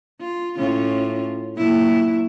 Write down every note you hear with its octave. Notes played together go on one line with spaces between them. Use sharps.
F4
A2 C#4 F4
A#2 F#3 E4